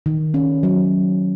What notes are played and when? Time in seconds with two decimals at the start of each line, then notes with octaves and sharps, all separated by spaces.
0.06 D#3
0.34 C#4
0.63 F#3